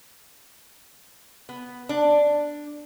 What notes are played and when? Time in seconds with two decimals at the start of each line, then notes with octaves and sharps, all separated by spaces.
1.49 B3
1.89 D4